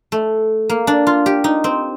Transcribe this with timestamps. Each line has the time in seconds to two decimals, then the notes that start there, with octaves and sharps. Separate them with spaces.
0.12 A3
0.69 A#3
0.87 D4
1.07 F4
1.26 G4
1.44 D#4
1.64 C4